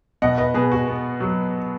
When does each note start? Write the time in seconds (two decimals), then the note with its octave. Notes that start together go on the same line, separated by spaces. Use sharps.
0.22 B2 D#5 F#5
0.38 B4 D#5
0.54 B2 G#4 B4
0.72 F#4
0.88 B3
1.20 F#3